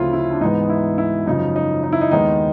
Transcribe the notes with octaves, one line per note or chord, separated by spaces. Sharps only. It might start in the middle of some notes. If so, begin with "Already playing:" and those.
Already playing: D2 C#3 F3 A3 C4 E4 F4
E4
D4
G#2 E3 G#3 B3 D#4
E4
E4
F#2 C#3 F3 D#4
D#4
D#4
E4
D#4
D#2 D#3 G#3 B3 D#4